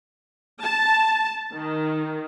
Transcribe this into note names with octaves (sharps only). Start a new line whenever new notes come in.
A5
D#3